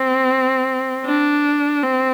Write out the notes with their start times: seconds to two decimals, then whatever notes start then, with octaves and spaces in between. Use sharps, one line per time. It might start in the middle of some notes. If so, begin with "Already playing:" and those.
Already playing: C4
1.05 D4
1.83 C4